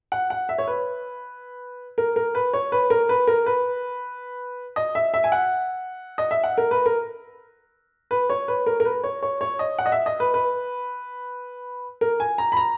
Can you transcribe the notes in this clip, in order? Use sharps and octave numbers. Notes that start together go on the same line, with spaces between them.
F#5
F#5
E5
C#5
B4
A#4
A#4
B4
C#5
B4
A#4
B4
A#4
B4
D#5
E5
E5
G#5
F#5
D#5
E5
F#5
A#4
B4
A#4
B4
C#5
B4
A#4
A#4
B4
C#5
C#5
C#5
D#5
F#5
D#5
E5
D#5
B4
B4
A#4
G#5
A#5
B5
A#5